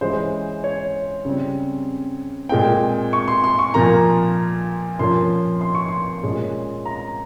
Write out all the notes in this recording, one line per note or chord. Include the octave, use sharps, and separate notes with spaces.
E3 G#3 C#4 C5
C#5
C#3 G3 C4
A#2 G#3 C4 G5
C#6
C6
C6
C#6
A#2 F3 A#3 A#5
A#2 F3 A#3 C#4 C6
C6
C#6
C6
A#2 G#3 C#4
A#5